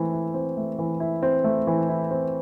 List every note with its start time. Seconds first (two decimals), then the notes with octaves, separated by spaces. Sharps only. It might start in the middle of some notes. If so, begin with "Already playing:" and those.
Already playing: E3 A3 C4
0.12 E4
0.34 C4
0.57 A3
0.79 E3
1.00 E4
1.23 C4
1.44 A3
1.67 E3
1.89 E4
2.11 C4